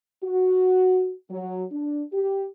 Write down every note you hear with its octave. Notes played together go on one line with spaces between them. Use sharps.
F#4
F#3
D4
G4